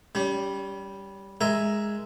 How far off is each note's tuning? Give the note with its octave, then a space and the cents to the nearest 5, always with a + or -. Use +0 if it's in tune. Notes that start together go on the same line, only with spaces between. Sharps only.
G3 +0 C#4 +35
G#3 +0 A#4 +0 E5 +0